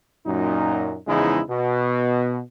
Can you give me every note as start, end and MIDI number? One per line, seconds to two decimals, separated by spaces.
0.26 0.97 42
0.26 0.97 46
0.26 0.97 63
1.07 1.41 40
1.07 1.41 49
1.07 1.41 53
1.07 1.41 56
1.07 1.41 63
1.07 1.41 64
1.49 2.41 47